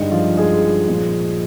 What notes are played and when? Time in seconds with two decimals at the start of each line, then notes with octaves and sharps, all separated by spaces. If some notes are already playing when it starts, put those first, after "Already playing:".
Already playing: G2 D3 G#3 D#4
0.12 F3 F4
0.37 G#3 G#4
0.88 A#2 F3 G#3